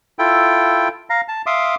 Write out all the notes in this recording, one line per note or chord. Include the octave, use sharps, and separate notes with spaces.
E4 F4 A4 G5
F5 A#5
A5
E5 F5 C6 D6 D#6